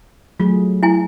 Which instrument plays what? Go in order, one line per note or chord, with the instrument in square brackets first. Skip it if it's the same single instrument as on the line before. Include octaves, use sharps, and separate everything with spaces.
[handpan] F#3 A3 G#4 [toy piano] F4
[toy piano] E4 G#5